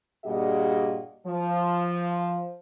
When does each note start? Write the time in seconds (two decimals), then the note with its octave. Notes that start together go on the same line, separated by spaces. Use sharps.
0.25 G2 A#2 G3 F#4 G#4 D#5
1.27 F3